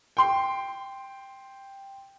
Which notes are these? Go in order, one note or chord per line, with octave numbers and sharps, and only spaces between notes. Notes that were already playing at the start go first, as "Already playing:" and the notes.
G5 C6